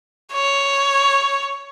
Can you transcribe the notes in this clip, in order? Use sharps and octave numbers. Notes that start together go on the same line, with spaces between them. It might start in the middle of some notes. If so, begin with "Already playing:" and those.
C#5